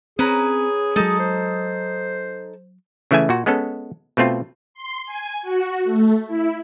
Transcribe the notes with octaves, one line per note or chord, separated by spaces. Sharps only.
C4 C#4 G#4 B4 A#5
F#3 G#3 D#4 A4
C5
C#3 E3 A3 E5 G#5
A#2 F#4
G#3 B3 C#4 A4
B2 A3 C4 F4
C6
G#5
F#4
A3
E4